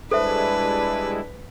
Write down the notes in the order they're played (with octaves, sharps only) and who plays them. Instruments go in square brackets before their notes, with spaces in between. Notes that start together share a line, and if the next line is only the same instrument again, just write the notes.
[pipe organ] G3 G#3 E4 [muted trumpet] D4 [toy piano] A4 C5 E5 [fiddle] B4